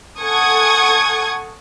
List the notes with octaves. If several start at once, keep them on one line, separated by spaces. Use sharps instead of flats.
A4 F#5 G#5 C#6 D#6 G#6